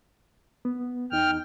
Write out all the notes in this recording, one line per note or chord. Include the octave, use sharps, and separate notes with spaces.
B3
E2 D#4 G5 F6